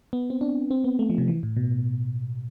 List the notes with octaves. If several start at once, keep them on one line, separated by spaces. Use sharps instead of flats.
B3
C4
D4
C4
B3
A3
F3
C3
E3
A2
B2